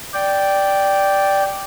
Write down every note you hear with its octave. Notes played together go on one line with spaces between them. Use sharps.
D5 G5